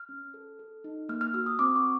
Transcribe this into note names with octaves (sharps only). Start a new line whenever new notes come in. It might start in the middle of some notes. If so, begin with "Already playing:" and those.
Already playing: F6
C#4
A4
A4
D#4
A#3 F6
F6
F#4 E6
D#6
C4 D6
C#6